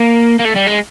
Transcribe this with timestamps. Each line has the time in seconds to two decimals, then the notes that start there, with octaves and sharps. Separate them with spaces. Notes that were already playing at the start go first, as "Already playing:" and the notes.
Already playing: A#3
0.39 A#3
0.44 A3
0.55 G3
0.66 G#3